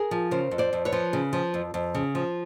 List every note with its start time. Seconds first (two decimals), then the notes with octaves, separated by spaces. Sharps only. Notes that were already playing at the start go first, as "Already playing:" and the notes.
Already playing: G#4 A#4
0.11 F3
0.31 C#3 A#4 C5
0.51 F2
0.58 C5 D5
0.73 F2
0.85 B4 C#5
0.92 F3
1.13 C#3
1.33 F3
1.54 F2
1.74 F2
1.95 C#3
2.15 F3